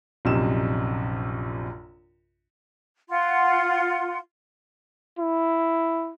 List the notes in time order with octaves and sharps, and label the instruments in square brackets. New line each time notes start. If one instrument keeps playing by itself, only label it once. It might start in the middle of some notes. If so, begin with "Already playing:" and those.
[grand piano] A#1 F#2 C3 D#4 E7
[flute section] F4 F#5 C6
[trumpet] E4